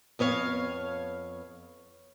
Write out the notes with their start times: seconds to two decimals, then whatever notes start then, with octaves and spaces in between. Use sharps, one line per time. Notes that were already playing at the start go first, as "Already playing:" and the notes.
0.19 F2 B3 C#5 F5